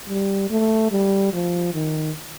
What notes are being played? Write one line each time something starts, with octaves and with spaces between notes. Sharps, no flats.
G3
A3
G3
F3
D#3